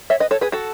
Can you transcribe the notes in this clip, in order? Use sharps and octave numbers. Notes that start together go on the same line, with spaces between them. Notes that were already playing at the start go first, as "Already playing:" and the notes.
C#5 E5
B4 D#5
A4 C#5
G#4 B4
F#4 A4